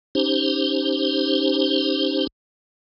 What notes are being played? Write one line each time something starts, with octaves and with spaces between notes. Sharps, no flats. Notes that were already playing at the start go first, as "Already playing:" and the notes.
C#4 D#4 G4 C5